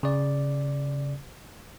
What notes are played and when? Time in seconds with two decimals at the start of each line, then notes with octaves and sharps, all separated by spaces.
0.03 C#3 D5